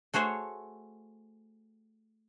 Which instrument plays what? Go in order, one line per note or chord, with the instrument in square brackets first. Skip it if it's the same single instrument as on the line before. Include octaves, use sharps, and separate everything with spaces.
[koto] A3 F#4 G#4 C5 C#5